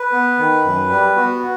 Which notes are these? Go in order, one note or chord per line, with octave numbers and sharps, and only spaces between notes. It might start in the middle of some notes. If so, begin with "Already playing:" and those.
Already playing: B4
B3
D#3
F#2
G3
B3 F#4